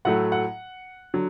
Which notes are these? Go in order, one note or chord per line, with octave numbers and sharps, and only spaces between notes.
A2 F#3 A3 F#5
F#5
D3 F#3